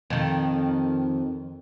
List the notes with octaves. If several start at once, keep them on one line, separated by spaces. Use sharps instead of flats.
F2 D#3